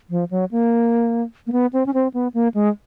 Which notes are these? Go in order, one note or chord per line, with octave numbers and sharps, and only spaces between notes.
F3
F#3
A#3
A#3
B3
C4
C#4
C4
B3
A#3
G#3